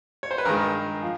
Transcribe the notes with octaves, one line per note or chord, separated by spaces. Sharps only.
C#5
C5
B4
G2 D#3 G#3 A#4
F3